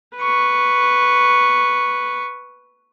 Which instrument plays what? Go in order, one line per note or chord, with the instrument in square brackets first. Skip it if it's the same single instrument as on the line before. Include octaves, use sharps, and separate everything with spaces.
[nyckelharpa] B4 C#6